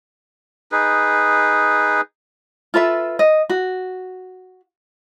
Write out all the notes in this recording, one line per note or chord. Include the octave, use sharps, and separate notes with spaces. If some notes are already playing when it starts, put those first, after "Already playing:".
D#4 G#4 B4
F4 A4 B4 E5
D#5
F#4